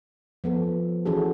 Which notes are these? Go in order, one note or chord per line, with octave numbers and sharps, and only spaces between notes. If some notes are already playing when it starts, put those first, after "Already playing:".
F3 B3 A4
E3 C#4 F#4 G#4 A4